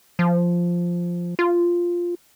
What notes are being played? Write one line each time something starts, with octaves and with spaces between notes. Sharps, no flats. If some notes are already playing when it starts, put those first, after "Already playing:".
F3
F4